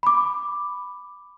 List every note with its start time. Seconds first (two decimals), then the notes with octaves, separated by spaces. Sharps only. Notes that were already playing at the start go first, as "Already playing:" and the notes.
0.03 B5
0.07 D6